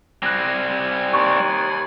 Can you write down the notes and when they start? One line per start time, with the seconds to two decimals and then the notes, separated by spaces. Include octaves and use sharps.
0.23 G3 C4 G#5 F#6 A#6
1.13 D#2 C6 C#6